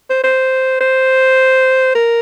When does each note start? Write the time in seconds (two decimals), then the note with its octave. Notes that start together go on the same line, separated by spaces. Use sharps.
0.10 C5
0.24 C5
0.81 C5
1.95 A#4